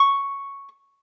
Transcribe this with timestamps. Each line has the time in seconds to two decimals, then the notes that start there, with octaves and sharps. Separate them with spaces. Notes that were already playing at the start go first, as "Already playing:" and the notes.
Already playing: C#6